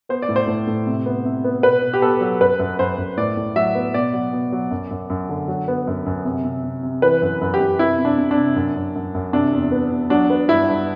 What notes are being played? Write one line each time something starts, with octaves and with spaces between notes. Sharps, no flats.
B3 C5
D5
A2
C5
A2
A2
C3
B3
C3
B3
B2 B4
B2
G4
B3 A4
F#3
F#2 B4
F#2
F#2 C5
F#2
A2 D5
A2
F#3 E5
B3
B2 D5
F#3
B2
F#3
F#2
F#2
F#2
D3
F#3
B3
F#2
F#2
C3
C3
C3
C3
E3 B4
F#2
F#2
G4
F#2
C3 E4
C3
D4
C3
D4
C3
F#2
F#2
F#2
F#2
C3 D4
E2
B3
E2
F#3 D4
B3
G2 E4
G2